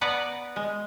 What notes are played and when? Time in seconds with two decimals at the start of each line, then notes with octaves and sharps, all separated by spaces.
0.01 B3 B4 D5 F#5 A#5
0.56 G#3